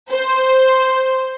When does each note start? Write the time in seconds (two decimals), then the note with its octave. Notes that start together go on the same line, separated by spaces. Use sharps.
0.12 C5